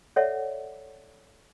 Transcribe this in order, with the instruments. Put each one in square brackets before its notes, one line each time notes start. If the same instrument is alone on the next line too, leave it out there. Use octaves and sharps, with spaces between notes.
[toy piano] A4 C#5 D5 E5 F#5